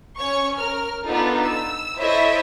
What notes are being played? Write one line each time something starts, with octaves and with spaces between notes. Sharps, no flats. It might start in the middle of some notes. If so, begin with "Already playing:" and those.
C#4 C#5 C#6
A#4 F6
B3 D4 D#4 F4 A4
E6
E4 A4 C5 C#5 D#5 E5